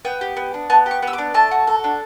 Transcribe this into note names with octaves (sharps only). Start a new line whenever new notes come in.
B3 G5
G4
B3
D4
B3 A5
G4 C#6
B3
E6
D6
D4
A3 A5
F#4
A4
D4